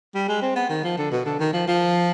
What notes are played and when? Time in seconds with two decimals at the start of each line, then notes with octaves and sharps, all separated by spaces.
0.14 G3
0.28 G#3
0.42 C4
0.56 B3
0.69 D#3
0.84 F3
0.98 D3
1.11 B2
1.25 D3
1.39 D#3
1.53 F3
1.67 F3